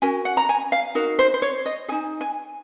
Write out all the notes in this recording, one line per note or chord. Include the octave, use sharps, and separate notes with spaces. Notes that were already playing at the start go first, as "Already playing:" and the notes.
C#4 F#4 A#4 G#5
F#5
A#5
G#5
F5
D#4 F#4 A#4
C5
C5
C#5
D#5
D#4 G#4 G#5
G#5